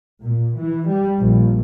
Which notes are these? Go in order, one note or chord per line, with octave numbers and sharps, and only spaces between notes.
A#2
E3
G3
A#1